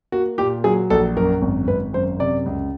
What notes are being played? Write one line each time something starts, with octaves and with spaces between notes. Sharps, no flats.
A#3 F#4
A#2 G4
F#3 G#4
A#1 A4
F#2 A#4
G#1
G#1 B4
F#2 C5
C3 D5
C#2